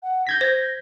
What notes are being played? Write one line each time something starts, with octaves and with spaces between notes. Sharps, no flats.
F#5
G6 G#6 A#6 B6
C5